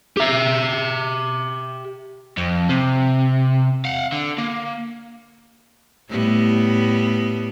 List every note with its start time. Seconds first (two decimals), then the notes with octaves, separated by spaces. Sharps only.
0.17 G4 E5
2.37 F2
2.69 C3
3.85 F5 F#5
4.12 D3
4.38 A#3
6.09 A2 G3 B3